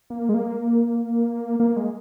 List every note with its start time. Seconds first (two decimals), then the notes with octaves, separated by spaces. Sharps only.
0.10 A#3
0.29 G#3
0.34 A#3
1.60 A#3
1.76 G#3